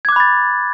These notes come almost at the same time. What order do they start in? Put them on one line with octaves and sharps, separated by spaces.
G#6 D6 F#6 B5 A6